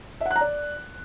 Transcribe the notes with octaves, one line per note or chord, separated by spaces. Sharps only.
E5
F#5
F#6
A#5
D5